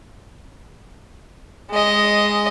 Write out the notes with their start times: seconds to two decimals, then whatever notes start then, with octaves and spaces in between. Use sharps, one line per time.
1.70 G#3 D#5